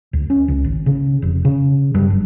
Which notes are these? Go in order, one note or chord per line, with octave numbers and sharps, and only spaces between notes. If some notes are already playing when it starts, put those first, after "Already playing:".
D2
C#4
C#2
G#1
C#3
F1
C#3
G2
F#1